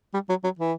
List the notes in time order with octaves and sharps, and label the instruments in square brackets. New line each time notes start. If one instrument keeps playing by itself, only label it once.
[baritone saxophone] G3
F#3
F#3
E3